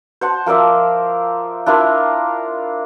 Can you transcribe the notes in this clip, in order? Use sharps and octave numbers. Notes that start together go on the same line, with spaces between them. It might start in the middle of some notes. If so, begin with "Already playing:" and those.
C5 F#5 A5
F3 A#4 D5 E5
D4 E4 F4 A#4